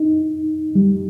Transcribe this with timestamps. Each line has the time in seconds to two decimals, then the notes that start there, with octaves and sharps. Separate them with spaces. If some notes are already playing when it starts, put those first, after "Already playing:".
Already playing: D#4
0.75 G3